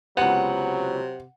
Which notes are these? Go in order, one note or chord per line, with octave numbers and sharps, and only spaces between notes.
C#2 C3 F#3 B3 F#5